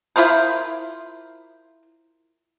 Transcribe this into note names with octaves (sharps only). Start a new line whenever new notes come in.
E4 F4 A#4 C5